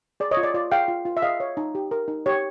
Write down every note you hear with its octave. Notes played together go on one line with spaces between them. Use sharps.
G#4 D5
C#5 D#5
F4
D5
F4 D5
G#4 F5 G5
F4
F4
E5
G#4 D#5 F5
C#5
D#4
G4
A#4
D#4
G4 C#5